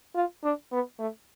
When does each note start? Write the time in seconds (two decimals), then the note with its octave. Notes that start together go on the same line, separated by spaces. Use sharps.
0.15 F4
0.44 D4
0.72 B3
0.99 A3